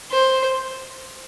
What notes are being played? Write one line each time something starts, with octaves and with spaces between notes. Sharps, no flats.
C5